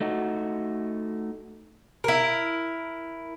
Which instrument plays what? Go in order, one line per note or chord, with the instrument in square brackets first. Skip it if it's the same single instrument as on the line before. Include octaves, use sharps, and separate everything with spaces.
[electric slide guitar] A3 D#4 F#4
[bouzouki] E4 A#4